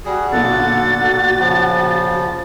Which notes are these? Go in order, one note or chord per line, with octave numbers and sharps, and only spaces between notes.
G3 F#4 G#4
B1 A#2 D3 A4 F#5 A6
C#3 F3